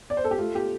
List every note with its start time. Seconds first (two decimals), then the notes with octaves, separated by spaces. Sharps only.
0.10 D5
0.17 C5
0.24 A4
0.31 G4
0.38 A3 F4
0.55 G4